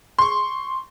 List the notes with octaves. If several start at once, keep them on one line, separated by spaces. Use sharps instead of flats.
C6 C#6